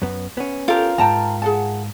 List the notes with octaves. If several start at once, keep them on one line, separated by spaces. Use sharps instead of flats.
F#2 B3
B3 C#4
F4 G4 A4 A#4
E2 G#2 G5 A5 A#5
G#4 F#5 A5